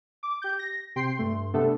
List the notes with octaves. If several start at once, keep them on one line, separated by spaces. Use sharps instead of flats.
D6
G4 G6
A#6
C3 G5 C6 C7
G2 A3 C6
C3 A3 B3 D4 A4